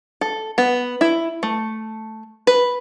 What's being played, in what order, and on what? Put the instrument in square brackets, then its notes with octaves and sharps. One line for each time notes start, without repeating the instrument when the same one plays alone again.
[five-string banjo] A4
B3
E4
A3
B4